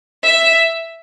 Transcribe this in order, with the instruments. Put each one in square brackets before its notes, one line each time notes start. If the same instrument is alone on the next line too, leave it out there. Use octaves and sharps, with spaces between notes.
[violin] E5